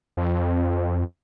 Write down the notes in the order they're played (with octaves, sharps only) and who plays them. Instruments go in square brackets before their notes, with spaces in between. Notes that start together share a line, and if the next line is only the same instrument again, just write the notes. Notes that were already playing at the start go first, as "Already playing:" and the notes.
[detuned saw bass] F2